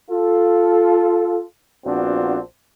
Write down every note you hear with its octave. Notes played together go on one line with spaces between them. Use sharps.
F4 A4
A#1 B3 C4 D4 F4 F#4